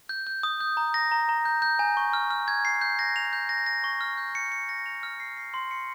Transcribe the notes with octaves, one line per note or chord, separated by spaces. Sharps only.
G6
G6
D#6
G6
A#5
A#6
A#5
A#5
G6
G6
G#5
C#6
F6
F6
G#6
C7
G6
A#6
F7
G6
A#6
A#6
C#6
F6
G6
C#7
C#7
A#6
F7
F6
C7
C7
C6
C#7